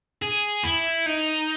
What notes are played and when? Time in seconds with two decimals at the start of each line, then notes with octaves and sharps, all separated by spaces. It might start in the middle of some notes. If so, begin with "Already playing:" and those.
0.22 G#4
0.64 E4
1.06 D#4